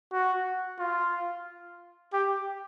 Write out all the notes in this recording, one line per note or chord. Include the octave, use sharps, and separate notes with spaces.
F#4
F4
G4